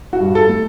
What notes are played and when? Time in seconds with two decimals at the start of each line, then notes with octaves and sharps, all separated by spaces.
0.13 F#4
0.20 G2
0.35 A4
0.49 A3